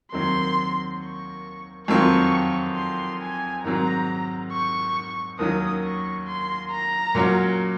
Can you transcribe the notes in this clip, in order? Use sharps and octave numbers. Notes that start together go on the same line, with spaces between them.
D#2 D#3 F#3 C4 C6
C#6
F2 D#3 F#3 C4 F4 C#6
C6
G#5
G#2 D#3 F#3 C4 A#5
C#6
D#2 D#3 F#3 C#4 D#6
C#6
C6
A#5
A#2 F#3 C#4 F#4